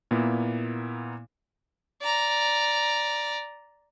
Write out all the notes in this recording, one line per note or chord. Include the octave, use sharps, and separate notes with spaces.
A#2 A#3 B3 E4
D5 A#5